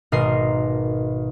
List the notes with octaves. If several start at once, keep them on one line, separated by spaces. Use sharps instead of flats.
G#1 B2 A#4 D#5 C6 C7